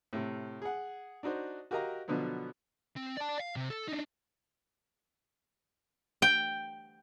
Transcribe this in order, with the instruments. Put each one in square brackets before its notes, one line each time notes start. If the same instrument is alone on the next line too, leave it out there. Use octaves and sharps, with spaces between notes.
[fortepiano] A2 C3
G#4 F#5
D4 D#4 F#4 C5
F#4 G4 A#4 D#5 F5 A#5
B2 D3 F3 F#3 B3
[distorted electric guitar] C4
D5 A5
F5
C3
A4
D4 D#4
[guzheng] G5